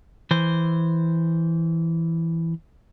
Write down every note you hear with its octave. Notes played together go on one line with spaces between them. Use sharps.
E3 C5